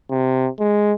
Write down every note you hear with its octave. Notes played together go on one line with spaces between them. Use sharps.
C3
G#3